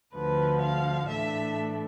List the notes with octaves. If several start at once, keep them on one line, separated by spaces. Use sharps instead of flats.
D2 D3 F3 B4
F5
A2 E3 A3 D4 E5